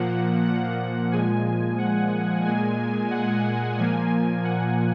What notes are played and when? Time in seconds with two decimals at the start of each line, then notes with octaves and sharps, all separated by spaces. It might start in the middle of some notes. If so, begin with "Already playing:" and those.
Already playing: A#2 F3 A#3 F#5
0.45 F#5
1.12 A#2 F3 G#3 G#5
1.78 F#5
2.45 A#2 G#3 G#5
3.11 F#5
3.78 A#2 F3 A#3 G#5
4.44 F#5